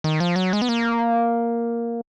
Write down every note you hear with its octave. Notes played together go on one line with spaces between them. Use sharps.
D#3
F3
F#3
G#3
B3
A#3